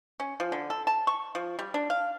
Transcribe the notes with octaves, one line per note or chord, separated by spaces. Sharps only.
C#4
F3
D3
A4
A5
C#6
F3
G3
D4
F5